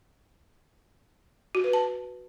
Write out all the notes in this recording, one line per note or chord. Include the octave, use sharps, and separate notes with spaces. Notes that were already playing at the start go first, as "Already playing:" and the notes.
F#4
B4
A5